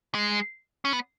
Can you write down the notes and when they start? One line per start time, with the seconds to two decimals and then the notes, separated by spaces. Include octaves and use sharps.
0.15 G#3
0.85 C#4
0.93 B3